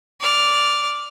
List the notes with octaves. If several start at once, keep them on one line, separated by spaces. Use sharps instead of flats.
D5 F6